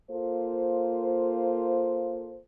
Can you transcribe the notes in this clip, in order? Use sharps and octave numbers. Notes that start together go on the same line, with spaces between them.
A#3 F4 A4 C5